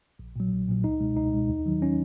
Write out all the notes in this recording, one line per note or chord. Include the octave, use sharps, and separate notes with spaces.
A#1
A#2 F#3
A#1
A#2 F#3
C#2 D#4
B2 G#3
C#2 D#4
B2 G#3
D#2
D#3 F#3
C#4